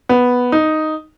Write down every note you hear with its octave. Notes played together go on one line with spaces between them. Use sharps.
B3
D#4